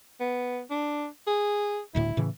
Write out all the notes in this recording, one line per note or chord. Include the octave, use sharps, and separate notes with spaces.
B3
D4
G#4
D#1 D2 A2 E4
A2 C#3 E3